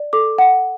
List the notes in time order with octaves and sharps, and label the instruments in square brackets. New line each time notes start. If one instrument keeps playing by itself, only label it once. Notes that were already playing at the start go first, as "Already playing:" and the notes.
Already playing: [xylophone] D5
A4 D6
F#5